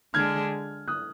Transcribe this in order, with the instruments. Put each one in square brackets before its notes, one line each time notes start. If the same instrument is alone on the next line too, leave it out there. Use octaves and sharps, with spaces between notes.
[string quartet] D3 G#3 D4 G#4 [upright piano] F6 G#6
[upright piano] D#6 F#6